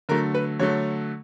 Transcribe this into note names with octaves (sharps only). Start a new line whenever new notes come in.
D3 F#3 A3 A#4
B4
D3 F#3 A3 C#5